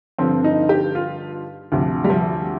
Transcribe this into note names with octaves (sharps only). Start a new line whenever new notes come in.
G2 D3 F3 C4
D#4
G4
F4
D2 C3 F3
G3
F3